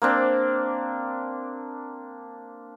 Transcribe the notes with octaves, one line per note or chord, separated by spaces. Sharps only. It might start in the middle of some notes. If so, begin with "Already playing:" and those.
A#3 C4 D4